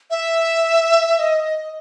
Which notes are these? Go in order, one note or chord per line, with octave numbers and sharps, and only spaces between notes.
E5
D#5